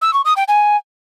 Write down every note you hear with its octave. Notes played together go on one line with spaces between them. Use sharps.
E6
C#6
D#6
G5
G#5